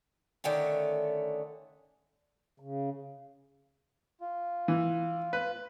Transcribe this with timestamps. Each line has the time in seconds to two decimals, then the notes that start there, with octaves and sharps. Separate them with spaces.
0.44 D3 D#3 A3 C#4
2.60 C#3
4.21 F4
4.68 E3
5.33 B4